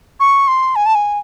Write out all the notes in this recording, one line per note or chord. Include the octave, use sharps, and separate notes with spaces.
C#6
C6
G#5
A5
G#5